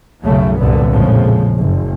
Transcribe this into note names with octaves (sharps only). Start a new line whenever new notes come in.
B1 F#2 C#3 F#3 A3
C2 F#2 A#2 D3 B3
A#1 F2 A2 C#3 F3 G#3
F#1